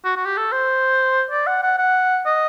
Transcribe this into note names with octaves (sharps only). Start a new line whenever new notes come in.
F#4
F#4
G4
A4
C5
D5
F#5
F#5
F#5
D#5